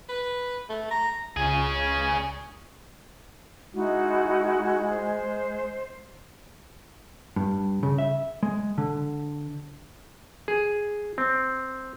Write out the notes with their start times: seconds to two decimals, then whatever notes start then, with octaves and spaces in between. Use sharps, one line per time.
0.09 B4
0.69 A3
0.91 A#5
1.37 C#2 C#4 G#4
3.74 G#3 D#4 E4 F#4
4.89 C5
7.36 G2
7.83 C#3
7.98 E5
8.43 G#3
8.78 D3
10.48 G#4
11.18 C4